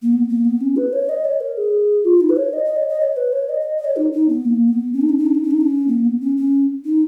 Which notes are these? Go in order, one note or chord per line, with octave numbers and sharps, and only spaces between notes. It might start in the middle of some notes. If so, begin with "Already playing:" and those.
A#3
B3
A#3
B3
C#4
B4
C#5
D#5
C#5
A#4
G#4
F4
D#4
B4
C#5
D#5
D#5
C#5
D#5
C#5
B4
C#5
D#5
D#5
D#5
C#5
D#4
D#4
B3
A#3
B3
C#4
D#4
C#4
D#4
C#4
D#4
C#4
D#4
C#4
A#3
B3
C#4
C#4
D#4